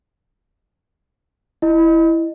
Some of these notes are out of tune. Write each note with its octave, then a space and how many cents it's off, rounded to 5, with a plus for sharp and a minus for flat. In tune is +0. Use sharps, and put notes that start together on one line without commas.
E4 +0 D#5 -10